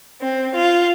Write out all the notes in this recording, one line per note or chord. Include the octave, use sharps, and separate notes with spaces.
C4
F4